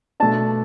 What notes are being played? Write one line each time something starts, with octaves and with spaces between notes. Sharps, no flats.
B2 A3 D4 A5